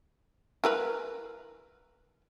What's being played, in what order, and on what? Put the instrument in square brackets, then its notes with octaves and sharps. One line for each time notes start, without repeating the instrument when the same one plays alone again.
[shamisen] E4 A#4 B4